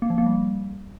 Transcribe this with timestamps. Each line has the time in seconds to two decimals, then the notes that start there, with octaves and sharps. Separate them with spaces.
0.02 A#3
0.10 F3
0.18 A#3
0.26 G3